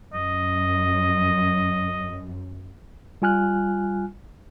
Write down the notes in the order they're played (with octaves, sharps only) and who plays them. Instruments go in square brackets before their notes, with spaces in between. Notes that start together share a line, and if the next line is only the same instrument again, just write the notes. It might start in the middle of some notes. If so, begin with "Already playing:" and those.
[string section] F#2 [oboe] D#5
[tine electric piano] G3 F4 G#5 F6 F#6